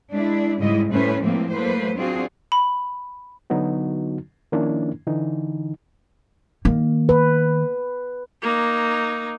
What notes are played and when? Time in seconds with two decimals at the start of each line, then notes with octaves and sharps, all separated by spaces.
0.11 G#3 D4 E4
0.60 G#2 C#3 G3 G#3 E4 D#5
0.89 A2 A3 C#4 B4 C5
1.21 A2 E3 F3 G#3 A#3 C4
1.53 F#3 A3 A#3 B4 C5
1.97 C4 D4 F4 F#4 G#4
2.52 B5
3.50 D3 F#3 B3 D#4 F#4
4.52 D#3 F3 A#3 C#4 D4 E4
5.06 D3 E3 D#4
6.65 D#3 A#3
7.09 B4
8.42 A#3 D#4